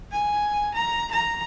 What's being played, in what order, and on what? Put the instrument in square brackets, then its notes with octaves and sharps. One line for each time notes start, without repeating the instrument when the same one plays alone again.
[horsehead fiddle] G#5
A#5
A#5